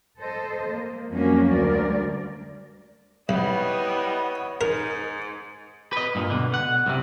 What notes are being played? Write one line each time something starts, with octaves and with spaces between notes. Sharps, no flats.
A4 C5 D#5
A#3
F2 F#3 G3 A#3 C#4 F#4
D2 G3 A#4 D5
B1 G3 B3 E4 C#5 D#5
G#2 D#4 A#4
B4 D#5
G2 A#2
B2 D3
F#5
C2 C3